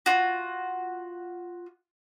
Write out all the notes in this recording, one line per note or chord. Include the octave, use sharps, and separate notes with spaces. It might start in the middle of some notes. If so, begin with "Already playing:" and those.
F4 F#4